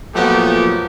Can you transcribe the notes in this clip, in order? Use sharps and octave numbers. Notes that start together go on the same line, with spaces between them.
A#2 F3 F#3 A3 B3 G4